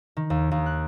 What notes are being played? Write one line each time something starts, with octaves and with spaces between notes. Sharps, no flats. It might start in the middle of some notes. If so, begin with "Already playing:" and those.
D#3
D#2
D#2
F#6